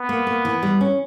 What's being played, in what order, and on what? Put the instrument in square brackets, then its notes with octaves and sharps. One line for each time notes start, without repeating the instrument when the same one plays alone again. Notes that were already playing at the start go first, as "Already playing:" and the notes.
Already playing: [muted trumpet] B3
[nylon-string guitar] A#3
A#3
E3
G3
C#4